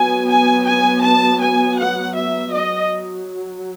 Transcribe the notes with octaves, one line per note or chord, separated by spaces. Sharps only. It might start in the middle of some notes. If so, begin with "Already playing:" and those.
Already playing: F#3 B3 G#5
G#5
G#5
A5
G#5
F#5
E5
F#3 D#5